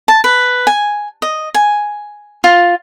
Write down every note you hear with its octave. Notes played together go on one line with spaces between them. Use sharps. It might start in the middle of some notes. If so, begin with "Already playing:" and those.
A5
B4
G#5
D#5
G#5
F4